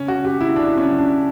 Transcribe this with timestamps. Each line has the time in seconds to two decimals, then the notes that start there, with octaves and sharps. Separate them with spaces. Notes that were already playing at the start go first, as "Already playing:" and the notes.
Already playing: C#3 C#4
0.08 F#4
0.24 C#3 G4
0.41 E4
0.56 C#3 D4
0.78 C#4
0.89 F#3
0.99 D4